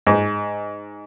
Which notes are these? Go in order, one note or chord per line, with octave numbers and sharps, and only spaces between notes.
G#2